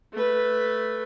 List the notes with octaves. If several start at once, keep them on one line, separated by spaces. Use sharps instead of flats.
A3 B4